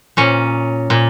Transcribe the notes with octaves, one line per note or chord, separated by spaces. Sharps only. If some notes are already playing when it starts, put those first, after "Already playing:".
A#2 C#4
A#2